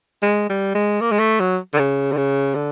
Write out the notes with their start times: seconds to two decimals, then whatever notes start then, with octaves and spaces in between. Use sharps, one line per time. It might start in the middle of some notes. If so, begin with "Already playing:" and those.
0.22 G#3
0.50 G3
0.75 G#3
1.01 A#3
1.12 G#3
1.19 A3
1.40 F#3
1.74 D3
1.78 C#3
2.12 D3
2.17 C#3
2.55 D3